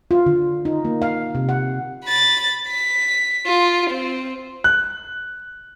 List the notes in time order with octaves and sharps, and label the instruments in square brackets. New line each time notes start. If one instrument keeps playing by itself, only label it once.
[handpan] F4
D3
D#4
A#3
F5
C3
F#5
[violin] B5 A6
B6
F4
C4
[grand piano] F#6